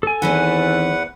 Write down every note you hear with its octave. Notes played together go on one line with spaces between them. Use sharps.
A4 G#5
E2 D#3 E3 C4 B4 F#5